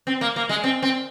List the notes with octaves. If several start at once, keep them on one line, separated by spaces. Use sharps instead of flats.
C4
A#3
A#3
G#3
C4
C4